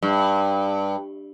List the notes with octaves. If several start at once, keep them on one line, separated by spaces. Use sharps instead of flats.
G2